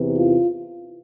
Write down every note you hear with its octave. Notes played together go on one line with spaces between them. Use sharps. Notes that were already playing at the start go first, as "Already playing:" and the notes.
Already playing: E2 C3 E3
F4